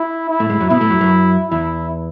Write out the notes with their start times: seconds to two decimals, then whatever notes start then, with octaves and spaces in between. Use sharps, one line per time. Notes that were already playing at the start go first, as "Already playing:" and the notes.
Already playing: E4
0.30 E4
0.40 A2 A3
0.50 G#2 G#3
0.60 F#2 F#3
0.70 B2 B3 E4
0.81 A2 A3
0.90 F#2 F#3
1.01 F#2 F#3
1.51 E2 E3 E4